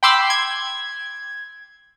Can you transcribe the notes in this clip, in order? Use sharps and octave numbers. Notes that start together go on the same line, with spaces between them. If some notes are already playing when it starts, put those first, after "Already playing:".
G5 B5 C6 D6 E6
G#6